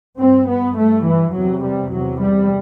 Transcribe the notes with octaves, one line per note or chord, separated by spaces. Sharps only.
G2 C4
B3
G2 A3
E3
E2 C3 F#3
G3
E2 C3 F#3
G3